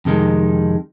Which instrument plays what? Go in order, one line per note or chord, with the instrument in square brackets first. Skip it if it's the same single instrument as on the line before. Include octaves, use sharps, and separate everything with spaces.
[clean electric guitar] F2 C3 D#3 G#3